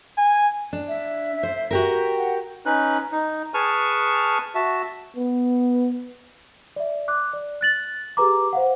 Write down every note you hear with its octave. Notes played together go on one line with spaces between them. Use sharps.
G#5
D4
E5
C5
F#4 G4 A#4
F#5
C#4 D#4 B4 F#6
D#4
G#4 B4 G#5 A5 C#6 F6
F#4 E5 A5
B3
D5 E5
D6 F#6
D5
F#6 A6 F#7
G4 G#4 B4 A#5 D6
C5 F5 F#5